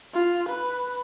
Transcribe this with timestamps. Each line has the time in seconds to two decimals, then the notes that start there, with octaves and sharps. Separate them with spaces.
0.14 F4
0.48 B4